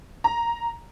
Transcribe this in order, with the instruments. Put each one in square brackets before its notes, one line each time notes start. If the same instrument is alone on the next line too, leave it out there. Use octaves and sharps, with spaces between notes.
[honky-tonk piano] A#5